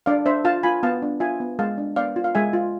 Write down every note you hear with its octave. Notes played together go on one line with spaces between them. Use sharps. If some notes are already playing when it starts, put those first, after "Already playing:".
D4 D5 F5
D4 C5 E5
F4 F5 A5
F4 G#5 B5
B3 F5 A5
D4
F4 E5 G#5
B3
G#3 F5 A5
D4
B3 D5 F5
F4
F5
G#3 E5 G#5
F4